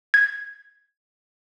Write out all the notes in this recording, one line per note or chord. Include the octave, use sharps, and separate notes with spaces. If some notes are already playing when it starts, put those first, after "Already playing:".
G#6